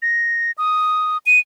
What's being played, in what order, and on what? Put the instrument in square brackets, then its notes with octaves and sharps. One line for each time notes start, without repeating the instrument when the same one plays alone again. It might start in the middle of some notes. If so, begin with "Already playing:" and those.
[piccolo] A#6
D#6
D#7